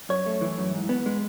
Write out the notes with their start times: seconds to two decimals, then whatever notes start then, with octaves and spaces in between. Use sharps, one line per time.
0.09 F#2 C#5
0.26 A3
0.41 E3
0.58 F#2
0.74 G#2
0.89 B3
1.06 G#3